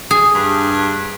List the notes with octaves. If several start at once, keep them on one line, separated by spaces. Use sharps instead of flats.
G#4
G2